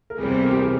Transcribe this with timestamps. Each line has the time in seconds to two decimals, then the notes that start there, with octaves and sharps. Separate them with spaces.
0.10 A#4
0.18 E2 C3 E3 G3 G#4
0.31 C5
0.44 A#4
0.51 G4
0.56 G#4